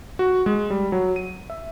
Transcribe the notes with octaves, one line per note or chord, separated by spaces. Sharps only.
F#4
G#3
G3
F#3
D#7
E5